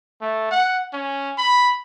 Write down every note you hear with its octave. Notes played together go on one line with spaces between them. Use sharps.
A3
F#5
C#4
B5